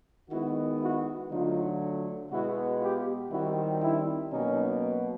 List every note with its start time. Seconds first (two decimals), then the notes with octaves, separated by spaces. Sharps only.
0.30 D#3 G#3 B3 E4 F#4
0.80 E4 F#4
1.30 D3 F#3 A3 D#4 F4
2.30 B2 G#3 B3 E4 F#4
2.80 F4 G4
3.30 D#3 G3 C4 E4 F#4
3.81 D4 E4
4.31 B2 F#3 A#3 C#4 D#4